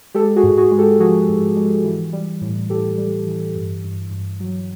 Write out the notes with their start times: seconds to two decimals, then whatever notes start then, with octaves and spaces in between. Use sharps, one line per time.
0.15 G#3 G4 A4
0.36 F#4 G#4
0.43 G#2
0.57 F#4 G#4
0.72 G#3
0.78 G4 A4
0.99 F3 F#4 G#4
1.29 G#2
1.56 G#3
1.84 E3
2.13 G3
2.41 A2
2.70 A2 G4 A4
2.97 G3
3.26 E3
3.55 G2
3.84 G2
4.11 G2
4.40 F#3